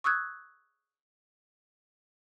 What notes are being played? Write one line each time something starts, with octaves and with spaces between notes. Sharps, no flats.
C#6 D#6 E6 F#6 G#6